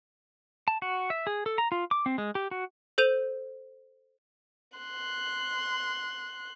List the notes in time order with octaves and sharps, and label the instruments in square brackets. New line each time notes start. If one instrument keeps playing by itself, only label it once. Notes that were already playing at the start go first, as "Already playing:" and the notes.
[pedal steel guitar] A5
F#4
E5
G#4
A4
A#5
F4
D6
C4
G#3
G4
F#4
[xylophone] A4 C5 G6 D#7 F7
[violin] C6 F#6